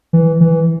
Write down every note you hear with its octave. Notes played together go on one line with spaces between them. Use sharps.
E3
E3